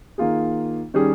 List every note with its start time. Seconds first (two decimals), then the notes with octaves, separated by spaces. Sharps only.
0.18 D#3 A#3 F4 G#4
0.94 D#3 G3 C#4 G#4